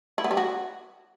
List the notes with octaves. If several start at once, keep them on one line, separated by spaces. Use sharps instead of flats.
E4
B3
G3
F#4